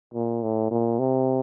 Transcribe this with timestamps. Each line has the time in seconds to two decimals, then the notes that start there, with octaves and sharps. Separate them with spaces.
0.14 A#2
0.43 A2
0.71 A#2
0.99 C3